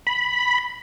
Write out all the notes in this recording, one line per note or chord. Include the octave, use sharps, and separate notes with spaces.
B5